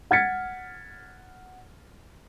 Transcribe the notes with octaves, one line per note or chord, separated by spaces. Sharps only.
F#5 F6 G#6 A6 B6 C#7